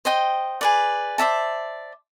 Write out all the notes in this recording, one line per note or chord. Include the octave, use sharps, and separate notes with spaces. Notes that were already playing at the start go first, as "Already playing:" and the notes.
C5 D#5 G5
G#4 B4 D5
C5 D5 E5 A5